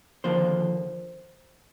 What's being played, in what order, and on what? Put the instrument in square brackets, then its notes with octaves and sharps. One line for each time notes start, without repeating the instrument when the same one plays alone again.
[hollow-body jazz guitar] D#2 D3 F3 A#3 D4 C5